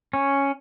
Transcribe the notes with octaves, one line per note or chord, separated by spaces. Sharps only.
C#4